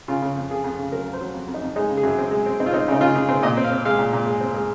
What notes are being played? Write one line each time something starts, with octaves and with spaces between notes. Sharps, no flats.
C#3 F4
C#3
F2
F2 G#4
F2
C#3
F#3 A#4
F2
C5
F#3
F2
F2
D#4
F2
G#3 D#4
C#3
G#4
F#2
C4
G#3
C4
C4 D#4
F4
C4 D#4
C#3
D#4
C#3 F4
C#3 G#4
C4 C5
A#2 D#5
C4
F5
C4
G#3 F5
A#2
A#2
G#3
C4
G#3